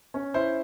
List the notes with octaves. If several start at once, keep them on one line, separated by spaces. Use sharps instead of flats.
C#4
E4 C5